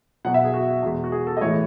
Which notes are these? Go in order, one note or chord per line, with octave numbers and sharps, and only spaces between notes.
B2 F#3 F#5
E5
G#4
F#4
E2 B2 G#3
F#4
G#4
A4
D#5
A2 E3 G#3 C#5